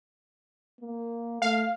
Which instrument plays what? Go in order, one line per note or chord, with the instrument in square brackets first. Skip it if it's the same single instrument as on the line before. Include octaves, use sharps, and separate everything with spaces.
[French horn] A#3
[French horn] A3 [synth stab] F5